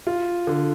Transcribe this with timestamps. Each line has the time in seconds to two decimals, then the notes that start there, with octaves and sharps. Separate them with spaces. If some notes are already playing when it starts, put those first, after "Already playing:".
0.07 F4
0.47 D3